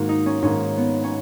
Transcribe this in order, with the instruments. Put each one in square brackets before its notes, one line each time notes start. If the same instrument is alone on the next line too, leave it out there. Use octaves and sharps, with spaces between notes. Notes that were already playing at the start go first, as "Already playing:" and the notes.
Already playing: [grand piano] G#2 D#3 A#3 [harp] F#4
[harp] D#4
C#4
[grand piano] G#2 D#3 A#3 [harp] C#4
[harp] B3
C#4